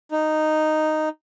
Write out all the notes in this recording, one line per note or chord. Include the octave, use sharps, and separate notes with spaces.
D#4